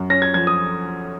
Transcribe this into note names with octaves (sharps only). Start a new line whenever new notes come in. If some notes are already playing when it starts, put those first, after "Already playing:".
Already playing: F#2
C#4 A#6
G#6
F3 G#6
D#6